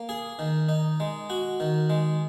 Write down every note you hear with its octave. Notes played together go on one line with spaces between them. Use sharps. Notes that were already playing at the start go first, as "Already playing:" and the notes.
Already playing: A#3
G#4
D#3
D#4
G#3
F#4
D#3
G#3